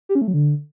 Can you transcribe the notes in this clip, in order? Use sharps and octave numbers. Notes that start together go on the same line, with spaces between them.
G4
C#4
A3
F#3
D3